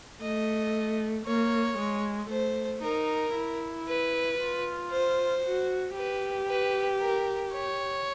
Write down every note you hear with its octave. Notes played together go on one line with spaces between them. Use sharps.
A3 D#5
A#3 C#5
G#3
A3 C5
D#4 A#4
E4
B4
F4
C5
F#4
G4 B4
B4
A#4
C#5